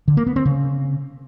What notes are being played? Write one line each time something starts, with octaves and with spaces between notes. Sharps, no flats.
D3
A#3
B3
C4
C#3